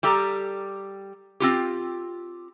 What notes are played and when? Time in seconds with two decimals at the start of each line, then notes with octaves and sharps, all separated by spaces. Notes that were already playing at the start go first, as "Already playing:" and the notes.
0.03 G3 G4 A4 A#5
1.40 C4 F4 G4